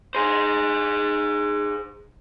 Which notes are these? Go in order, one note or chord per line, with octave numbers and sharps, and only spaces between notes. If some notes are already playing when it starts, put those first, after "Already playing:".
G#4 C5